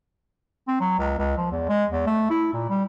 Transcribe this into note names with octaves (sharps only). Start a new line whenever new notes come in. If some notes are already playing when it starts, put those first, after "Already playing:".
C4
F#3
C#2
C#2
F3
E2
G#3
E2
A3
E4
A#2
G3